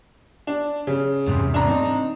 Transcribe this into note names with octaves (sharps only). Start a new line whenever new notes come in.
D4
C#3
E2 G#2 C3
D4 A#5
C4 D#4